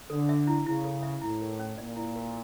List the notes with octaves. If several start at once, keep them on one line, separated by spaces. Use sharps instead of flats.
D3 A4
E5
E4
C#3 E4
A4
E5
A2 E4
A#4
C#4
A#2 D5
E4
A#4